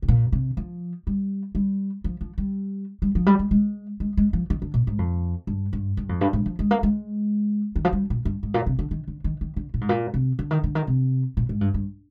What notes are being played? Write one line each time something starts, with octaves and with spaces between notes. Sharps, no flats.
C3
A#2
C3
F3
G3
G3
F3
F3
G3
G3
F3
G3
G#3
G#3
G#3
G#3
F3
D#3
D3
A#2
G#2
F2
G2
G2
G2
F2
G2
G#2
F3
G#3
A#3
G#3
D#3
F3
G3
A#2
G2
G#2
A#2
C3
D3
D#3
D3
D#3
D#3
D3
A#2
G#2
A#2
C3
D3
D#3
D3
D#3
C3
A#2
G#2
G2
G2